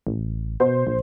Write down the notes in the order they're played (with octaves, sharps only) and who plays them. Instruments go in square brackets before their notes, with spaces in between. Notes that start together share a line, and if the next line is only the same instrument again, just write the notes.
[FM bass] A1
[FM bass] B2 [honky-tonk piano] C5
[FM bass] A#1